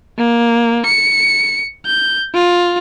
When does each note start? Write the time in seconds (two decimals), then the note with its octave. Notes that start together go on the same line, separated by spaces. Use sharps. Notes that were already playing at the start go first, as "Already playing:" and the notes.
0.17 A#3
0.86 C#7
1.86 G6
2.34 F4